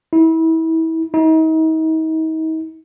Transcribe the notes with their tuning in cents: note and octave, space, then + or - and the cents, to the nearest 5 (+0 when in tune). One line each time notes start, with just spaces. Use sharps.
E4 -30
D#4 +40